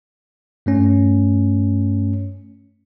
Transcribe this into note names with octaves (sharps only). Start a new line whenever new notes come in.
G2 A3 C#4